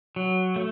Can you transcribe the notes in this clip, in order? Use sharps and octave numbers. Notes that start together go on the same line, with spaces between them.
F#3
A3